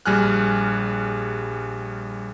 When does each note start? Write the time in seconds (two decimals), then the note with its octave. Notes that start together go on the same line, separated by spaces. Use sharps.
0.06 A#1 G3 G#4 G#5 F6 F#6